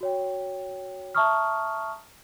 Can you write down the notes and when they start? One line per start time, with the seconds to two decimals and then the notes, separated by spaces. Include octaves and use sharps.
0.01 F#4 C#5 G5
1.15 E5 A5 A#5 C#6 D#6 F6